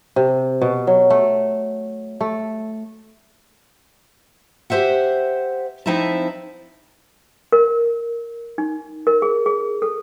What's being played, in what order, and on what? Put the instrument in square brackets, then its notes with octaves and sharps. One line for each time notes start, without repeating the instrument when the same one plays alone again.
[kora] C3
B2
F#3
A3
A3
[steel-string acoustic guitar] G4 G#4 C5 E5 F#5
F3 C4 D#4 E4 E5 A5
[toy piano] A#4
D#4
A#4
G#4
G#4
A4